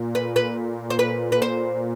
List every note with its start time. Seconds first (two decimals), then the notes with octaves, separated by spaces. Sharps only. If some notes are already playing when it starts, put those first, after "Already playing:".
Already playing: A#2
0.15 B4
0.36 B4
0.90 C5
0.99 B4
1.32 B4
1.42 C5